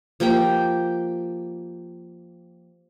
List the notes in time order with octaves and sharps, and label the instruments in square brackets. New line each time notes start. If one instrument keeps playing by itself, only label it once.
[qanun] F3 A#3 G4 G5